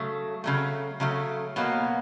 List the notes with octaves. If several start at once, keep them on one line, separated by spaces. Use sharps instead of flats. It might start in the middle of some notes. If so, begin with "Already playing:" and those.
Already playing: C#3 F#3 A3
C#3 F#3 A3
C#3 F#3 A3
B2 F#3 A#3